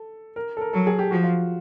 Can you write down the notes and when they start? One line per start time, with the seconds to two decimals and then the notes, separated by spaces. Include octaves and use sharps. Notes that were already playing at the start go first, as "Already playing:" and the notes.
Already playing: A4
0.36 A#4
0.57 A4
0.61 A#4
0.73 F#3 A4
0.87 G#4
0.99 G4
1.11 F3 F#4
1.24 F4